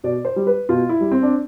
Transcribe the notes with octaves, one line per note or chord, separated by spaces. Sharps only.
B2 D5
C5
G3
B4
B2 F4
E4
G3
C4
D4